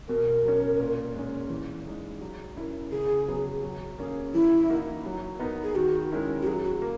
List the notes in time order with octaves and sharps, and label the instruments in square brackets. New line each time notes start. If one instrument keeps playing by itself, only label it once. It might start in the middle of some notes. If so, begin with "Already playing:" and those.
[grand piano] B2 [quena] A#4
[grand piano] F#3 C#4
A#2
G#3 C#4
E3
G#3 D#4 G#4
F#3
C#4 E4 A#4
[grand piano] C#3 [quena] G#4
[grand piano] F#3 B3
F#3
A#3 C#4 G#4
[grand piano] E3 [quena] E4
[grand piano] A#3 D#4 F#4 A#4
F#3
B3 D#4 A#4
[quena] G#4
[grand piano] D#3 [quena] F#4
[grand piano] G#3 C#4 E4 A#4
[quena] F#4
[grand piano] F#3 [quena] G#4
[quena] F#4
[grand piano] A#3